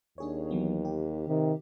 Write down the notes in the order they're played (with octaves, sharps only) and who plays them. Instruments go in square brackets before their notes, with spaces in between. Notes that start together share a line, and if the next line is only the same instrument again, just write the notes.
[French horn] D#2 [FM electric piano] D4 G#4 C#5
[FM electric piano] E3 F#3 B3
G4
[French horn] C3 [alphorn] D#3